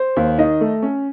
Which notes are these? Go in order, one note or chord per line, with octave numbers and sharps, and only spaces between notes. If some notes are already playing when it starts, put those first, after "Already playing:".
Already playing: C5
D#2
D#3 D#5
A3
C#4